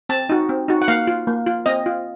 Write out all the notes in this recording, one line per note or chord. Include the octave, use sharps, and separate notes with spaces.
C4 A5
D#4 F#4
C4
D#4 F#4
F#5
A#3 F5
F4
A#3
F4
C4 D#5
F4